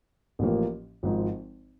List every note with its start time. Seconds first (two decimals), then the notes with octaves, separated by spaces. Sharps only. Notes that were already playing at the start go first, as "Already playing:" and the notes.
0.39 A1 A2 F3 A#3
1.03 G#1 G#2 F3